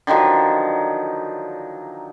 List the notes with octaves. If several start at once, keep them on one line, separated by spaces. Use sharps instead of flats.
D3 D#3 F3 F#3